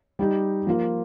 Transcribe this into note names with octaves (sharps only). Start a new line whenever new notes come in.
G3 D#4 G4
F3 A#3 F4 A#4